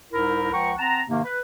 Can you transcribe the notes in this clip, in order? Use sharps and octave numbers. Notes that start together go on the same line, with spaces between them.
C2 G#2 D#4 E4 A#4
C#2 F3 F#5 G5 A#5 C#6
C4 F#5 A5 A#5
G#2 C3 D#3 A#3
B4